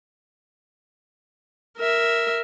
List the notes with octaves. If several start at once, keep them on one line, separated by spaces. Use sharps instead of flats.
A#4 E5